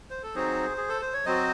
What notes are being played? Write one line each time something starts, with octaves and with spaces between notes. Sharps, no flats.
C5
A4
F#3 C4 D#4 F#4 G#4 C5
G#4
A4
C5
C#5
F#3 C4 F#4 C5 D#5